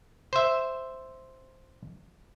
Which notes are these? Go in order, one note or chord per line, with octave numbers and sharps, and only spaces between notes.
C5 E5